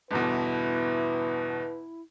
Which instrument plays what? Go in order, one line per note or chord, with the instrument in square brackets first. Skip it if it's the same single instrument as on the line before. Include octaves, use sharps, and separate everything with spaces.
[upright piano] G1 E2 B2 [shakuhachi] E4 [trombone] B4